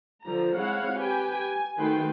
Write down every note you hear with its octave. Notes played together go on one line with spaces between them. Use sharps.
D3 F3 A#5
G#3 C4 E4 C#5 F5 F#5
G4 B4 G5 G#5
G#5
D#3 A3 F#4 B4 G5 C6